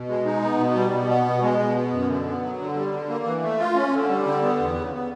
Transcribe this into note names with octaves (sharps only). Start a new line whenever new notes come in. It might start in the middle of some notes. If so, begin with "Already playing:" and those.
Already playing: B2
G#3
D#4
B3
B2
G3
B2
B3
B2
G#3
B2
B3
F#2
D3
B3
F#3
D3
G3
D3
A#3
E3
A3
F4
C#4
D3
G3
D3
B3
E2
C#3
B3